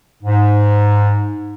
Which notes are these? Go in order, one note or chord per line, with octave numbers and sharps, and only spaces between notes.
G#2